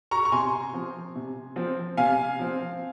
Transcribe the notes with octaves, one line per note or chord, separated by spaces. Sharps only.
A#5 C#6
C#6
C3 G#5 C6
F3 C4
C3
F3 C4
C3 F5 G#5
F3 C4